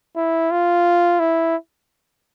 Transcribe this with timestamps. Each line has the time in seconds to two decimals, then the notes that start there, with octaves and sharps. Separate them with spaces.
0.16 E4
0.51 F4
1.20 E4